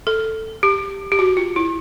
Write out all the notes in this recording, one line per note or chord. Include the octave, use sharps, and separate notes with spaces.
A4
G4
G4
F#4
F4
E4